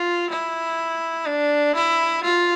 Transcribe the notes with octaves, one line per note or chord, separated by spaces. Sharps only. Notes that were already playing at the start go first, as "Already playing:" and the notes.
Already playing: F4
E4
D4
E4
F4